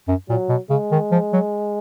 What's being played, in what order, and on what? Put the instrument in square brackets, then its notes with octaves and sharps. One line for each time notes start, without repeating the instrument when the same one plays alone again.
[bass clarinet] F#2
[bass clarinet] A#2 [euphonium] F#3
[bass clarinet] B2
[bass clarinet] C#3 [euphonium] G#3
[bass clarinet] D#3
F3
F#3